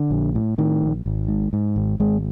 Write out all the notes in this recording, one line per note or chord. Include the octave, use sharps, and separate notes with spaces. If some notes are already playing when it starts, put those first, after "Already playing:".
Already playing: D3
A#1
A2
A2 D#3
A#1
G#1
G#2
G#2
G#1
G#1 G#3